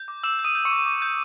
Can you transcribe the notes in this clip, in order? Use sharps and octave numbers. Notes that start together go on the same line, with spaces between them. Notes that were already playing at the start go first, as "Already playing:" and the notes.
Already playing: G6
D6
D6 E6 E7
G6
D#6 D#7
G6
C#6 C#7
D6
D6
G6